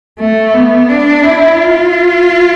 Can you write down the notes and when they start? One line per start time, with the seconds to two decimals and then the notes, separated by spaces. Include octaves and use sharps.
0.19 A3
0.54 B3
0.89 D4
1.23 E4
1.56 F4